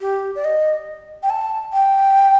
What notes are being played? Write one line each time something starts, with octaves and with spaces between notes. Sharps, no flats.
G4
D5
D#5
G5
A5
G5